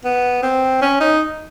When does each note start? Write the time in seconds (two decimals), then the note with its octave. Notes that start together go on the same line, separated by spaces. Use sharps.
0.04 B3
0.43 C4
0.81 C#4
1.00 D#4